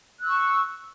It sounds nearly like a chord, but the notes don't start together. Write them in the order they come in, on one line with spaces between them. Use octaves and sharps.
F#6 E6 C#6